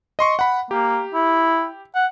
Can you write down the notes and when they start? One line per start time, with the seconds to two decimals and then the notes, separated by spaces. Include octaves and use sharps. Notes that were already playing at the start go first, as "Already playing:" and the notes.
0.19 D#5 C6 C#6
0.39 F#5 B5
0.71 A#3 G4
1.14 E4
1.95 F#5